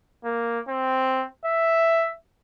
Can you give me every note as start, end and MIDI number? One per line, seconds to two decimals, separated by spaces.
0.25 0.59 58
0.69 1.26 60
1.45 2.11 76